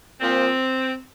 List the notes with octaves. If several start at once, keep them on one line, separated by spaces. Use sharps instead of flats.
A#2 F3 C4